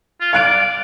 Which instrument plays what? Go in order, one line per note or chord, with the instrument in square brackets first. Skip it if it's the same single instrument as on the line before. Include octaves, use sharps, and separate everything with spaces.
[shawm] F4
[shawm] D5 [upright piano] F5 F#6 D7